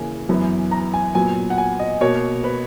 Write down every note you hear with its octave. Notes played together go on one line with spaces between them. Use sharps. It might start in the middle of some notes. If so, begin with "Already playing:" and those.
Already playing: C#3 E3 A#3 G#5
F#2 E3 B3
A#5
G#5
A#2 F#3 B3 G#5
F#5
G#5
D#5
B2 A#3 C#5
B4